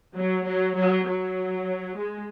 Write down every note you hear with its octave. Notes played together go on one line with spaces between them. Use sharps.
F#3
F#3
F#3
F#3
G#3